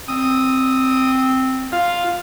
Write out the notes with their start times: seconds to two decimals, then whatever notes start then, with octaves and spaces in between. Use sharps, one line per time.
0.08 C4 D#6
1.72 F4 F5